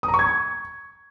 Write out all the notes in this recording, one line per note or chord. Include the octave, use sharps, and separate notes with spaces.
D#6
A#5
C#6
G#6
C#6